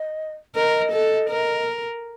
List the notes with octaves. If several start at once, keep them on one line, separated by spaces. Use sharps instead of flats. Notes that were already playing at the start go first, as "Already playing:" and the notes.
Already playing: D#5
A#4 D#5
A4
A#4